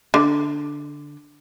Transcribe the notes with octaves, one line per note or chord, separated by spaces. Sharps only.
D3